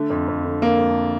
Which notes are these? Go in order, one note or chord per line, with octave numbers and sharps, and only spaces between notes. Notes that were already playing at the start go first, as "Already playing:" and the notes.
Already playing: D3 A3
F2
F2
D3
D3 A#3
F2